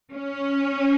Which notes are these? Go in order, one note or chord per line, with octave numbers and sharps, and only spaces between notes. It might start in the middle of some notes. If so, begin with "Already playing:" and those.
C#4